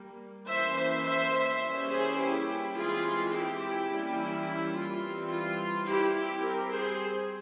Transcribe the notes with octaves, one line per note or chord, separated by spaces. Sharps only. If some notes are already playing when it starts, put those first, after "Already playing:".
Already playing: G3 A#3
E3 A#3 C#4 C5 E5
C5 E5
C5 E5
C5 E5
E3 G3 A#3 C#4
G#4 C5
E4 G4
E3 G#3 C4 F4 G#4
E4 G4
E3 G3 A#3 C#4
E4
E4
F4
E3 G3 C4
F4
E4 G4
G3 C4
G4 A#4
G#4 C5